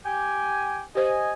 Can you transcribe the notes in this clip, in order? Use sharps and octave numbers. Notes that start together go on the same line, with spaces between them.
G4 G5 G#5
G4 C5 D#5 G#5